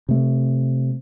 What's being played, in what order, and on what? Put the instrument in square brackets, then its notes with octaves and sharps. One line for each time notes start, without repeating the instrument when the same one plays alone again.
[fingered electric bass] C3 A3